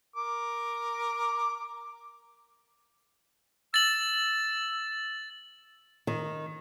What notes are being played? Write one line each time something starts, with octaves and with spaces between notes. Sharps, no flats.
A#4 D6
E6 A6 F#7
D#3